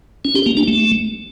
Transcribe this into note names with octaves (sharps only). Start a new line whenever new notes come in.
C#4
G4
A#3
D4
A3